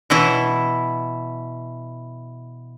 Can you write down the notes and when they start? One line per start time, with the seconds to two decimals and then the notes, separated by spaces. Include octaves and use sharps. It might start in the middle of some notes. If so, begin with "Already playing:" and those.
0.10 B2 E3 E4